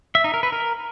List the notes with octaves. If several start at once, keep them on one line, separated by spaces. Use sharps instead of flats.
E5
D#4
A#4
B4
A#4